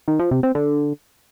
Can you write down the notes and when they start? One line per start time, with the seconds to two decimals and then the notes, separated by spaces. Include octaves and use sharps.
0.08 D#3
0.19 F3
0.31 C3
0.43 C4
0.55 D3